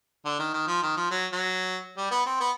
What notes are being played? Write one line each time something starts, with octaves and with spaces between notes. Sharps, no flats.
D3
D#3
D#3
F3
D#3
F3
F#3
F#3
G3
B3
C4
B3